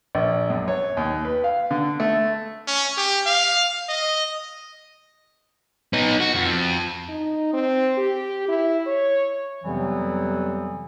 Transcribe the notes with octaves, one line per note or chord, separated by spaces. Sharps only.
A#1
F#2
C#5
D#2
B4
F5
D3
A3
C#4
G4
F5
D#5
B3 D#4
F#4
F2
D#4
C4
G4
E4
C#5
F2 C3 E3 F#3 G3 B3